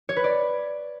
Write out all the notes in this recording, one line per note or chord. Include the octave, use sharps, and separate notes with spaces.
C#5
B4
D5